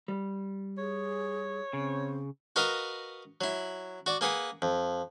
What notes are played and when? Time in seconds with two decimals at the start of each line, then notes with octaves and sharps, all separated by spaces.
0.08 G3
0.78 G#4 C#5
1.73 C#3 C4
2.56 F#4 A#4 B4 D#5 F5
3.41 F#3 E4
4.06 F#4 D5
4.21 A#3 G#4 B4 F#5
4.62 F2